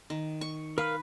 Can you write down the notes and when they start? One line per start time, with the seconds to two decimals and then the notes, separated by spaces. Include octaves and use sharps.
0.10 D#3
0.41 C#6
0.78 A#4 B4 F5 F6